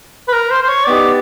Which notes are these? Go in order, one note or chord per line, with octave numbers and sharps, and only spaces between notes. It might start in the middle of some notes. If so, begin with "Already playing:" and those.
B4
A#4
C5
C5
C#5
B3 D#4 G4 D5